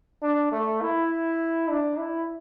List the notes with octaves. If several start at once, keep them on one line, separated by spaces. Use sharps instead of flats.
D4
A3
E4
D4
E4